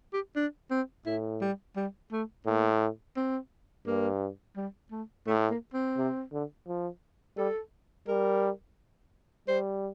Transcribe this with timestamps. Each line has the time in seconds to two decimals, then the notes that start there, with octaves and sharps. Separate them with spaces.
0.13 G4
0.36 D4
0.71 C4
1.06 A2 E4
1.41 G3
1.76 G3
2.12 A3
2.46 A2 A#3
3.16 C4
3.87 G2 A#3
4.56 G3
4.92 A3
5.27 A2 A3
5.50 A#3
5.74 C4
5.97 C3
6.33 D3
6.67 F3
7.37 G3 A4
8.08 G3 A#4
9.48 G3 C5